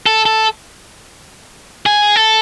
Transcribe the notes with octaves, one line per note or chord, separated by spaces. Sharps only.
A4
A4
G#4
A4